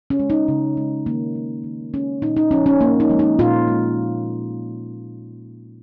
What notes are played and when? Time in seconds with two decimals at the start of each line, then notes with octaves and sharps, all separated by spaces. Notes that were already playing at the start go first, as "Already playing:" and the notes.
0.10 C#4
0.20 G#3
0.30 D#4
0.48 C#3
0.77 G#3
1.06 D#3 A#3
1.35 G#3
1.64 D#3
1.93 G#3 C#4
2.22 A#2 D#4
2.37 D#4
2.51 F3 G#3 C#4
2.66 C#4
2.80 A#2 A#3
3.00 D#4
3.09 F3 G#3
3.19 D#4
3.39 A#2 F4
3.68 G#3